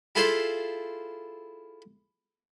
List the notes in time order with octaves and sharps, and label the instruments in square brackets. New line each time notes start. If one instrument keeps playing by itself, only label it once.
[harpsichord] E4 F4 G#4 A4 C5 E5